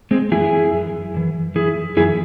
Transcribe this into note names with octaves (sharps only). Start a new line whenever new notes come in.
G#3 C4
F#2 E3 E4 G#4
F#2 E3
F#2 E3
F#2 E3 E4 G#4
F#2 E3 E4 G#4